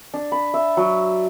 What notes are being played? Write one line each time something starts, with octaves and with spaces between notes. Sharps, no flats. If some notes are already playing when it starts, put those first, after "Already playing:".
D4
B5
E5
F#3